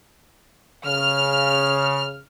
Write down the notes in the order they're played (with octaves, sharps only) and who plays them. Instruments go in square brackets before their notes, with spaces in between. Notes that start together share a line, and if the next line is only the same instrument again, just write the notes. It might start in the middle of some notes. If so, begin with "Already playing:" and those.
[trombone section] C#3 [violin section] F6